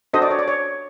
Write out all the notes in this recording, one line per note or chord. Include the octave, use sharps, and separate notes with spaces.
D4 F#4 A4 C5 D#5
D5
C#5
D5
C#5